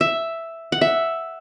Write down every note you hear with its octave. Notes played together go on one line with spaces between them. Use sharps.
E5
F#5
E5